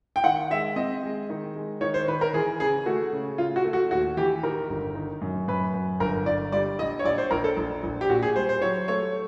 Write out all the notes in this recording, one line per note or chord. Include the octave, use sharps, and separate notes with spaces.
G5
D#3 F#5
G#3 E5
C4 D#5
G#3
D#3
G#3
D#3 C#5
C5
D#3 B4
A#4
E3 G#4
C#3 G#4
A3 F#4
C#3
C#3 F4
F#4
A3
F#4
D#2 F#4
E3 G4
D#3 A#4
G1
D#3
F#2
F#2 B4
F#2
G1 A#4
G1 D5
G3 D5
A#1 D#5
C#5
A#1 D5
C5
A#1 A#4
A4
A#1
A#1
G4
A#2 F#4
G#4
G3 C5
C5
F#3 C#5
A3 C#5